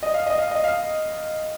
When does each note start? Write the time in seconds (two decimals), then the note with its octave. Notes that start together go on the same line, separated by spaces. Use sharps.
0.03 D#5
0.14 F5
0.26 D#5
0.38 F5
0.51 D#5
0.64 F5